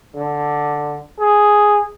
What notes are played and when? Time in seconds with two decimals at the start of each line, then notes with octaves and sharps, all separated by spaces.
0.16 D3
1.20 G#4